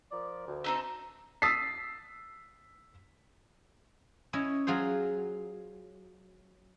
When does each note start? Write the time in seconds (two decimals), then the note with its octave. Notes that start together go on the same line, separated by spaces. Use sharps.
0.12 F3 A#4 D5
0.47 D2
0.64 C4 D#4 A4
1.42 D#6 E6 A6 B6 C7
4.33 C#4 E4 C#5 D#5
4.67 F#3 F4 G#4 C5